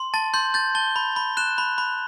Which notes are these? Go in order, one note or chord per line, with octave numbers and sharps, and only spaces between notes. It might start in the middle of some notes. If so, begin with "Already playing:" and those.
Already playing: C6
A5 A6
C6 G6
G6 A6
A5 G7
B5
B5
F#6 E7
B5
B5